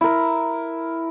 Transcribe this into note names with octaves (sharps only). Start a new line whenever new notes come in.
E4 A#4